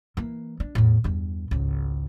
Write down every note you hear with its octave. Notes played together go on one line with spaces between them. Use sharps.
E3 A#3
D4
E2 A2
E2 G2
G#1 C#2